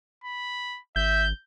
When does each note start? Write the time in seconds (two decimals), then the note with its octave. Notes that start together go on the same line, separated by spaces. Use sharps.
0.24 B5
0.96 G#1 E5 G6